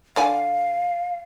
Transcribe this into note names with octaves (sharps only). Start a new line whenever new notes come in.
D3 D5 F5 G#5